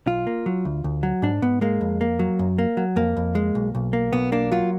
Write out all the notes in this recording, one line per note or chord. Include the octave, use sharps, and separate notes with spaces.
B1 F4
A#3
F#3
D2
D2
F#3
G#2 D4
G#2 B3
G#3 A#3
F2
A#3
F#3
F#2
A#3
F#3
F2 A#3
F2
G#3
B1
B1
A#3
B1 B3
A#3 D4
F#3 F4